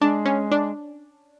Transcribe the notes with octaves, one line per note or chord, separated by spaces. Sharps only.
G#3 D4
C#4
D4